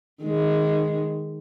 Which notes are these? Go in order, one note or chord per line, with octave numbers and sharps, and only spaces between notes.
D#3 G#3